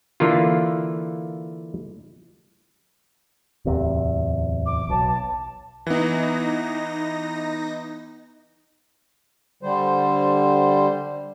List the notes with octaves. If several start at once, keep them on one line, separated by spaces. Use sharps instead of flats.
D3 E3 A#3 F4
D1 E2 C3
D6
B1 A5
E3 B3 D#4 A#6
D3 G3 C5